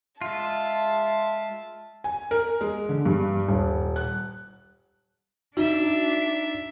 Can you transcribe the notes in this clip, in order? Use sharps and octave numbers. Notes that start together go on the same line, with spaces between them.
G#3 F4 E5 A5
G#5
A#4
G#3
D3
G2
D#1
F#6
D4 D#4 F#4 E5